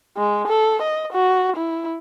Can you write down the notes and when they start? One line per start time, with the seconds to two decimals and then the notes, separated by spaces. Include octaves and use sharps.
0.17 G#3
0.47 A4
0.82 D#5
1.13 F#4
1.56 E4